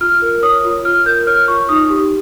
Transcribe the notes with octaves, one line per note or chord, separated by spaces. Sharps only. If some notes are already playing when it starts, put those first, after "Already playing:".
F4 F6
A#4
C#5 D#6
F4
F4 F6
A#4 G6
C#5 F6
F4 C#6
D#4 D#6
G4